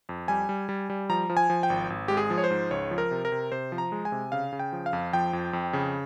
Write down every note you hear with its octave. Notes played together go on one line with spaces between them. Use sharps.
F2
G3 G#5
G3
G3
G3
F3 A#5
F3
G#5
F3
G5
G#1
G#1
G#3 G4
G#4
F3
C#5
C5
G#2
C#2 C#5
F3
A#4
C3
A#4
C3
C3 C5
F3
A#5
G#3
G#5
C3
C#3 F5
C#3
G5
F3
F5
F2
F3 G5
F2
F2
C#3